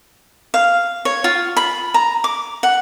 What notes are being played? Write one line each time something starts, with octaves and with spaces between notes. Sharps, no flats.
F5
C#5
F4
B5
A#5
D6
F#5